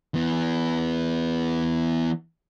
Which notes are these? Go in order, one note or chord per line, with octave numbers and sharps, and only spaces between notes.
E3 B3